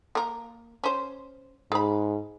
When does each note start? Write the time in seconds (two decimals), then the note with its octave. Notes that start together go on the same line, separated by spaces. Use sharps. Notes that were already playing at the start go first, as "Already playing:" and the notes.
0.15 A#3 A#4
0.84 C#4 C5
1.72 G#2 G#4 B5